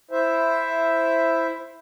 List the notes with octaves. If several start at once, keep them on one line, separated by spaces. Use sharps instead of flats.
E4 C5 E5